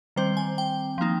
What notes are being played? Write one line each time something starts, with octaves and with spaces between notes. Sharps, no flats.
D#3 G3 C4 C5
G#5
G5
F3 A#3 D#4